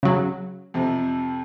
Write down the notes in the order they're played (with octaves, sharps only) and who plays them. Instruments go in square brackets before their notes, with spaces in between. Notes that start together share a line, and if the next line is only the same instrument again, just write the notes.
[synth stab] C#3 F#3
[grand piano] F2 C3